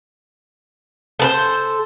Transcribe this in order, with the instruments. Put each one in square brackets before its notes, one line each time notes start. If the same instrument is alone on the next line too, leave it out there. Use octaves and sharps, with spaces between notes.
[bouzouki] A4 B4 C5